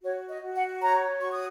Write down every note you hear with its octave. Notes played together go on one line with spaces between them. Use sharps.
F#4 C#5
D#5
F#4
F#5
C#5 A#5
F#4 C#6
D#6